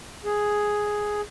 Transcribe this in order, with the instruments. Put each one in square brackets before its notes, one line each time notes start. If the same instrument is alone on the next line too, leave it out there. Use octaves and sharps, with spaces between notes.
[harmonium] G#4